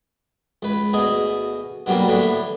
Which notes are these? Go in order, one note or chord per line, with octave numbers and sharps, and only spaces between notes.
C#2 B4
D2 B2 G#4 D#5
B2 D3 F#3 G3 A#3
A2 D3 E3 B3 D4